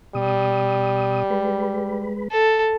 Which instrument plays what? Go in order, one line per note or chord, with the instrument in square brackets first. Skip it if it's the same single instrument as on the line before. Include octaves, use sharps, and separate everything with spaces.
[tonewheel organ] B2 D#6 [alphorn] G3
[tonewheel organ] G#3 B4
[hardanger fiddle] A4